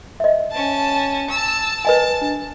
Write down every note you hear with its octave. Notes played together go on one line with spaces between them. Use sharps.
D#5 E5
C#4 A5
A5 E6
B4 D#5 G#5 A5
D4